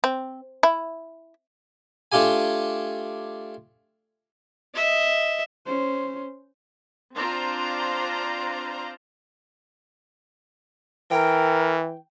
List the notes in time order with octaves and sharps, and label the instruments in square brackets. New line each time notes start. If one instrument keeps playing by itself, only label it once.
[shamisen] C4
E4
[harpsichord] A3 D4 F4 G4 G#5
[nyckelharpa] D#5 E5
[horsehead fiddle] C#4 C5
[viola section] C4 D4 F4 C5 A#5
[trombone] E3 [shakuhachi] A#4 [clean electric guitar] G5